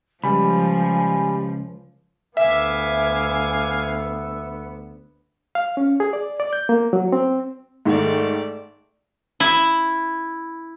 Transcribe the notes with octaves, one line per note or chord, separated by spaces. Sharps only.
C#2 F3 G3 G#5 B5
D2 B3 E5 F5 G#5 D6
F5
C#4
G#4
D5
D5
G6
A#3
F#3
C4
G#2 D#3 A3 D5
E4